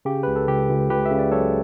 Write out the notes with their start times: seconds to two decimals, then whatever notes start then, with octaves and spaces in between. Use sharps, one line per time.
0.05 C#3 G4
0.23 C#2 B4
0.36 A4
0.48 C#2 G4
0.69 C#2
0.89 C#2 G4 B4
1.05 E5
1.10 C#3
1.19 D5
1.31 F#3 A4 C#5